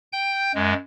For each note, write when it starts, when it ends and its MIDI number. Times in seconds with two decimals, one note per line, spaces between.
0.13 0.52 79
0.13 0.52 91
0.55 0.74 42
0.55 0.74 56